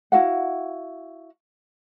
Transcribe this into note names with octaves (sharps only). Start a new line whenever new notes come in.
E4 F#4 F5 F#5